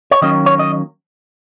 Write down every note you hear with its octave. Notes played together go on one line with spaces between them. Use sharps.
C#5
D#3 F#3 A#3 C#4 D#5
C#5
D#5